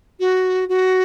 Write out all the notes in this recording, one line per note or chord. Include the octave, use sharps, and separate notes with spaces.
F#4
F#4